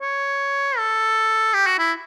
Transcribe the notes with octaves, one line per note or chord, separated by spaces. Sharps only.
C#5
A4
G4
F#4
E4